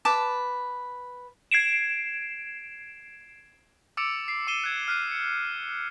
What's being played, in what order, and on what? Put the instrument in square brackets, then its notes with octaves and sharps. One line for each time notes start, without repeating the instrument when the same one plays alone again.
[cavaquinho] B4 A5 D6
[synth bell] G#6 C7 D7 E7
[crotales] D6 E6 A6 C#7 D7 F7
C7 D7
D6 C7 D#7 E7 G7
F#6 G#6 E7
F6 F#6 C7 D#7
C#7